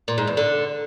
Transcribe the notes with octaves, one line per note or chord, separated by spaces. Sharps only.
A#2
G#2
E2
D3